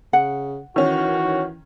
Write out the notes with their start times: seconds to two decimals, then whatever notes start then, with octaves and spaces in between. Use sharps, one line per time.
0.13 C#3 F#5
0.76 D#3 E3 C#4 F#4